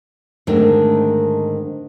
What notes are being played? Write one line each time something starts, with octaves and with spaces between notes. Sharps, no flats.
G#2 D3 D#3 A3 C4